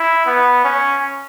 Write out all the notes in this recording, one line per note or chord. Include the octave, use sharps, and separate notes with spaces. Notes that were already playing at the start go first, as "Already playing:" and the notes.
Already playing: E4
B3
C#4